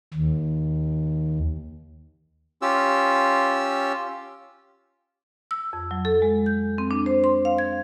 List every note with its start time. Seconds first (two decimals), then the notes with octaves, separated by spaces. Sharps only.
0.14 D#2
2.62 C#4 F4 G4 E6
5.51 E6
5.73 F2
5.91 F#3
6.05 A4
6.22 G#3
6.46 G6
6.78 C4
6.91 D4
7.06 C5
7.24 C6
7.45 F5
7.58 G#6